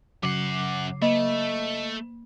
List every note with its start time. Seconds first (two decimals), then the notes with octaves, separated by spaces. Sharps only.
0.23 F#2 C#3 F#3 F#5 D6 C7
1.02 A3 A#3 D#5